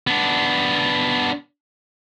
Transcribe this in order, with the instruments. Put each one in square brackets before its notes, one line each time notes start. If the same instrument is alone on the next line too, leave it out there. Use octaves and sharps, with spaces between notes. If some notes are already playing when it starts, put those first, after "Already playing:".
[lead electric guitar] B3 D4